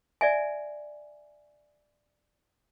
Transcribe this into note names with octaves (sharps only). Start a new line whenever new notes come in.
D5 E5 G#5